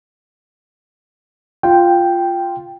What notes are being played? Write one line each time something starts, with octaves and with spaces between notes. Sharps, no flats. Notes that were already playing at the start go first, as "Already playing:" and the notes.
F4 G5